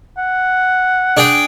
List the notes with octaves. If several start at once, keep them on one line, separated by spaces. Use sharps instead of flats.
F#5
D4 G#4 G5